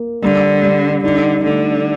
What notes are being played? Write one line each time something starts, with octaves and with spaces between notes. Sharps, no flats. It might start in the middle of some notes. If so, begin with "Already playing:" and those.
Already playing: A#3
D3 G3
G3
D3 D#4
D3 A3